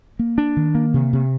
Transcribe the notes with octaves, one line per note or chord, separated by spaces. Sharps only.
A#3
D4
D#3
A#3
C3
C3